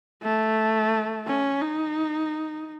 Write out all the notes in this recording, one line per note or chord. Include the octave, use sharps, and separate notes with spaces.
A3
C#4
D#4